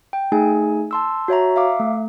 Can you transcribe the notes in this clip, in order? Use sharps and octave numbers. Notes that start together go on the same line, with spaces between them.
G5
A3 D#4 G#4 G#5
A5 C6 E6
F#4 C#5 E5 A#5
E5 F5 D6
A3